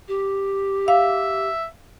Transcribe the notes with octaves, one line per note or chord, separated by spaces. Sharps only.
G4
E5 F5